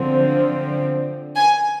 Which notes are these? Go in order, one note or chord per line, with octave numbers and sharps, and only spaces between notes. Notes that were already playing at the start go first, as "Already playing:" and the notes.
Already playing: D3 F3 C4
G#5